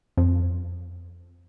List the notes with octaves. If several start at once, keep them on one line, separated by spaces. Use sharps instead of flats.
F2